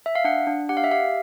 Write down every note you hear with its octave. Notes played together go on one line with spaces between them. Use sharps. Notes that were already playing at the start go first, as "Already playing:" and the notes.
E5
F5
D4 F#5
D4
G4 F#5
F5
E5
G4 F5